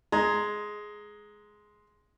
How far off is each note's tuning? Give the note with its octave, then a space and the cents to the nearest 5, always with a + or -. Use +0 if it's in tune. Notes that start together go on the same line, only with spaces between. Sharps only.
G#3 +5 A#5 +0